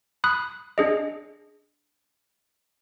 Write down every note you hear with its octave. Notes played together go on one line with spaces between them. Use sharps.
B5 D#6 F#6
D4 G#4 D#5